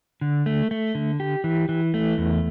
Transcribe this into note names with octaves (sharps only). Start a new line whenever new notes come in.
D3
A3
A3
D3
G4
E3
E3
A3
E2